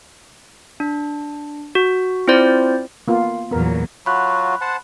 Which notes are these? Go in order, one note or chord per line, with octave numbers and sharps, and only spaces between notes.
D4
F#4
C4 E4 F4 C5 D5
A#3 B3 F4
E2 A#2 F#3 B3 A#4
F#3 F4 F#4 B5 F#6
C5 F#5 A5